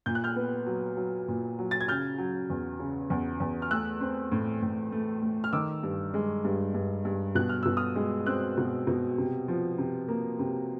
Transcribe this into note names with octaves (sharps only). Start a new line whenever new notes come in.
A#2 G6
F#6
F6 G6
B3
F#3
F#3
A#2
F#3
A6
G#6
C#3 F6 G6
F#3
E2
C#3
E2
E2
F6
A3 E6 F#6
C4
A2
A2
A3
A3
F6
D#3 D6 E6
G2
G#3
G2
G2
G2
B2 F#6
F6
B2 E6
D#6 F6
G#3
C4 E6 F#6
B2
B2
C3
F3
C3
A#3
C3